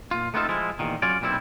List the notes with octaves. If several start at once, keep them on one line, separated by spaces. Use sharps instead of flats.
A#2 F4
A3 B3 C4 D#4 F4 A4
F3 G#3 E4 F4
E2 A#2 D#3
F#3 C#4 F4 C#5 D5
B1 A#2 G3 C4 E4